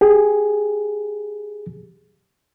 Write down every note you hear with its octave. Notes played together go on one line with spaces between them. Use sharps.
G4 G#4